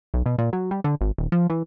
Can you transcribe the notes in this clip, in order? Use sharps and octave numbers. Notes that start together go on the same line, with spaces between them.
B1
B2
A#2
F#3
G3
D3
G#1
D#1
F3
E3